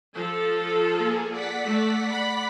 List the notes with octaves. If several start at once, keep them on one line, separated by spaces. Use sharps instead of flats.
F3 A4
A#3 G#4
D5 F#5 B6
A3
B5